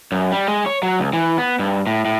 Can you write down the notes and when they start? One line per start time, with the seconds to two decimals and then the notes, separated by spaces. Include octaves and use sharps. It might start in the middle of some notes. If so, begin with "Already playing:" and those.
0.12 F#2
0.32 G3
0.48 G#3
0.66 C#5
0.83 F#3
1.00 C#2
1.13 E3
1.38 B3
1.59 G2
1.87 A2
2.05 A2